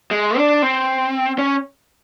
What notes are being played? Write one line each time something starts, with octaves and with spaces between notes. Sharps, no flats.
G#3
D4
C4
C#4